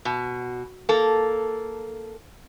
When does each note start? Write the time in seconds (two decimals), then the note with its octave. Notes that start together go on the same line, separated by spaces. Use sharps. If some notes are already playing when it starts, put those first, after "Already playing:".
0.05 B2
0.89 A#3 A4